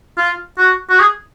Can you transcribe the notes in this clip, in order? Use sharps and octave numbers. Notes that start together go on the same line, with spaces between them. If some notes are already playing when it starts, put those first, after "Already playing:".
F4
F#4
F#4
G#4